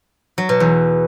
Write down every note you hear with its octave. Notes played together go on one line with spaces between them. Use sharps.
F#3
B2
E2